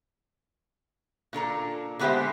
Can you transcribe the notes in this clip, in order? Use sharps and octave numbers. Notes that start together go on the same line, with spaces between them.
A#2 D4 A4 A#5
D3 G#3 B3 G4 C5 E5